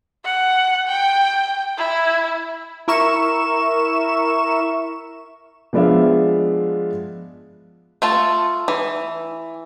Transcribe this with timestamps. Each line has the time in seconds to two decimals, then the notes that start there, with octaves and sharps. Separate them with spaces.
0.25 F#5
0.88 G5
1.77 E4
2.88 E4 A#4 E5 C#6 E7
5.73 F3 G#3 B3 D4 E5 F5
8.02 A3 F4 A5
8.68 E3